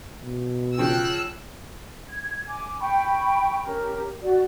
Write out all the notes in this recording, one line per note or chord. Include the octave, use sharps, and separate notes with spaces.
B2
C#3 F3 G5 E6 F#6
G#6
G#5 D6
G5 B5 C#6
C#4 G4 A#4
F#4 D5